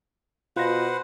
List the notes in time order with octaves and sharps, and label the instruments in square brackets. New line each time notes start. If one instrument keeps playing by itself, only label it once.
[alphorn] B2 [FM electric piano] F4 A#6 [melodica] B4 C5 F#5